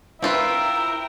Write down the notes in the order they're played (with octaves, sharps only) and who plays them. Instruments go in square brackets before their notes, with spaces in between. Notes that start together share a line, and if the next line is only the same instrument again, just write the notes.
[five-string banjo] C4 F4 B4 [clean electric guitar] E4 [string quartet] A#4 G5 [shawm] E5